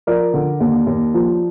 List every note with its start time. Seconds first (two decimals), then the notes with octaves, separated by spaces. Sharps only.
0.07 F3 A#4 D5
0.34 D3
0.60 D#2
0.87 D#2
1.14 F3